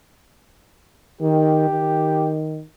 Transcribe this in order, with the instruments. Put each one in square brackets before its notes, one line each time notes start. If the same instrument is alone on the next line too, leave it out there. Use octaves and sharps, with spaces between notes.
[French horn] D#3 [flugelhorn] G4
[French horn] D#3